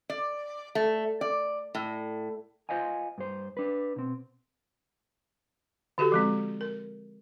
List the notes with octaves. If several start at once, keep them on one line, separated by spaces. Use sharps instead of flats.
D5
A3
D5
A2
F4 C5 D#5 F5 G#5
G2 C5
D4 B4
B2 C4
D3 F#4 G4 A4
F3 G#3 C4
A#4